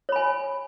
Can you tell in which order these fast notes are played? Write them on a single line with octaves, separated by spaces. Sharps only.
C#5 B5 G#5